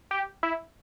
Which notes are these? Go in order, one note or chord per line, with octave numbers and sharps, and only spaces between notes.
G4
E4